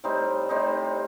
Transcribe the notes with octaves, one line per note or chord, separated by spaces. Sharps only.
A2 G3 C4 D#4
A2 G3 C4 D#4